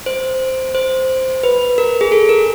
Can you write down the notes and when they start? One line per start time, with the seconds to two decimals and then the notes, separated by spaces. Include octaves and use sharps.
0.06 C5
0.75 C5
1.43 B4
1.78 A#4
2.01 G#4
2.12 A4
2.29 A#4